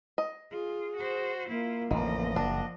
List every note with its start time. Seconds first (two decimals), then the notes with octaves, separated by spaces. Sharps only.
0.18 D#5
0.52 F4 G#4
0.97 F#4 C5
1.49 A#3 E4 F4
1.91 A1 F2 D3 D#3 F3 D#5
2.36 F#1 D4